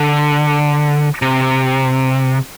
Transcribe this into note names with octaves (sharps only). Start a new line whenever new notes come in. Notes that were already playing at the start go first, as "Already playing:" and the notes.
Already playing: D3
C3